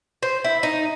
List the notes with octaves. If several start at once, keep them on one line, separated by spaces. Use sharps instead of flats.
C5
E4
D#4